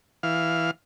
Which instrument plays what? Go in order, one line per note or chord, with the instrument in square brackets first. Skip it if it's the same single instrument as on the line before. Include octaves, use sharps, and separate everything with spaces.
[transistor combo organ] E3 F5